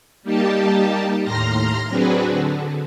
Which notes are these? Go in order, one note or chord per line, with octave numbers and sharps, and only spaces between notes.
G3 A#3 D#4 G4 A5
D#2 A2 A#5 C6 F6 A#6
F#3 C4 D4 F#4 G#4 B4
D3